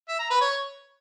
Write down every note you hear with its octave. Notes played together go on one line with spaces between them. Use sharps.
E5
A#5
B4
C#5